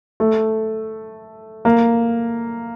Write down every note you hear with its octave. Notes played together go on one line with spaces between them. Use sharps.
A3
A#3